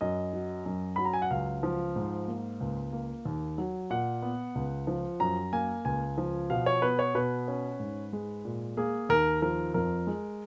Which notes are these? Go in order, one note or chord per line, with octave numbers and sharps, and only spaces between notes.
F#2 D#5
F#3
F#2
F#3 B5
A#5
G#5
F#5
C#2 F5
F3
G#2
A#3
C#2
A#3
D#2
F#3
A#2 F#5
B3
C#2
F3
F#2 A#5
A#3 G#5
C#2 G#5
F3
B2 F5
C#5
B3 B4
C#5
B2 B4
C#4
G#2
G#3
A#2
A#3 G#4
D#2 A#4
F3 A#4
F2 A#4
G#3